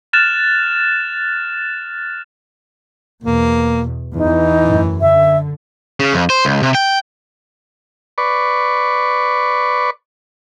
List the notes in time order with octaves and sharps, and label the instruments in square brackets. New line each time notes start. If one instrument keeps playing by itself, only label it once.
[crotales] F6 F#6 A6 E7 F7
[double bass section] E2 B2 [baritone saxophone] A#3
[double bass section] E2 [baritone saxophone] E3 [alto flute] D#4
[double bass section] F#2 A2
[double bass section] D3 [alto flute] E5
[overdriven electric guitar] C#3
F2
C5
C#2
C3
G5
[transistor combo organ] B4 D5 C#6